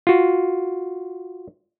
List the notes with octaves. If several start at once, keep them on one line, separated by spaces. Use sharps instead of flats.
F4 F#4